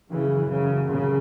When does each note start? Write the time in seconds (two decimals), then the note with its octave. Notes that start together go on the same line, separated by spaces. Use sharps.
0.10 F#2 C#3 E3
0.50 C#3
0.89 C#3